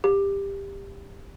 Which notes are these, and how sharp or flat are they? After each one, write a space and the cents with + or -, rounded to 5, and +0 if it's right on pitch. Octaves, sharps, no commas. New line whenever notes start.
G4 +15